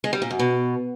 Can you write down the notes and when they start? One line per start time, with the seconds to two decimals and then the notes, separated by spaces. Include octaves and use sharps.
0.04 G#3
0.13 G3
0.22 A#2
0.31 F#2
0.39 B2